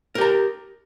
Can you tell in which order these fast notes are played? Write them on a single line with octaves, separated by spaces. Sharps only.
A#4 G4 A#5